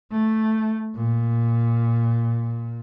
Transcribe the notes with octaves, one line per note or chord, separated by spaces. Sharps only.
A3
A#2